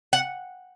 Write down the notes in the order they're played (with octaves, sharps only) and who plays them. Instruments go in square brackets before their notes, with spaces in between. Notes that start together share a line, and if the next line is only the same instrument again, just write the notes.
[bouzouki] F#5